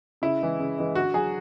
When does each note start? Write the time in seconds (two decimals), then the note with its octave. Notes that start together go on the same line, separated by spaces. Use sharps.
0.22 C#3 E4
0.41 E3 G#3
0.60 C#3
0.78 E3 G#3
0.95 D3 F#4
1.14 F#3 G#4